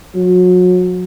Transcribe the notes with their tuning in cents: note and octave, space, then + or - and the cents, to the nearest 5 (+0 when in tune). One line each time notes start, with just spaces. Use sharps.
F#3 -35